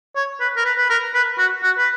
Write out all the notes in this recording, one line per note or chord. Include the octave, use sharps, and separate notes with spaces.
C#5
B4
A#4
B4
B4
A#4
B4
F#4
F#4
B4